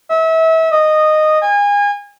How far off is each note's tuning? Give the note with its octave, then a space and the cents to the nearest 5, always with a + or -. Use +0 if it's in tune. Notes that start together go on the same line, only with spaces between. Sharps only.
E5 -30
D#5 -10
G#5 -30